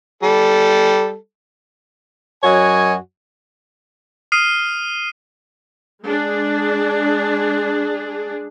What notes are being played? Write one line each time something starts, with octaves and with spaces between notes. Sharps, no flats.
G3 A4
F#2 F#3 F#4 C#5 D#5 G#5
D#6 F6 C7 D#7
G#3 D4 G#4